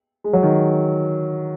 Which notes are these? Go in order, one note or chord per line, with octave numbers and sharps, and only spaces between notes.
G#3
F#3
D#3